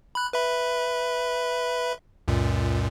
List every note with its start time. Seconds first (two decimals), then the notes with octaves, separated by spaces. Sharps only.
0.15 B5 F#6
0.33 B4 E5 B5
2.28 C#2 F#2 A#2